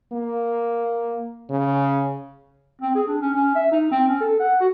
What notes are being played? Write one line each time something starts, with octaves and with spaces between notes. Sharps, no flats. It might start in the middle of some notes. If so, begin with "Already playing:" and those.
A#3
C#3
C4
G#4
D4
C#4
C#4
E5
D#4
C4
C#4
A4
F#5
F#4